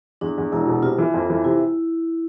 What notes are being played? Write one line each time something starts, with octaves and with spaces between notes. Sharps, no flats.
E2 D4
E2
E1 E4
B2
C3 F4
E3
F2
E3
C3 E4